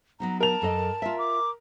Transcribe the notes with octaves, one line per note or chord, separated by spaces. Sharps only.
F#3 B3 D#4 A#5
A#4 A5 F7
F#2 A4 D#5
F4 E5
D6